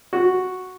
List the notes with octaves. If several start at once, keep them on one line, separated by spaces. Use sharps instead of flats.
F#4